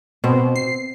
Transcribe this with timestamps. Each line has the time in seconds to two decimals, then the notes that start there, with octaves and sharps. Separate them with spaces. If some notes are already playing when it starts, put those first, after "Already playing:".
0.24 B2 C4
0.56 C7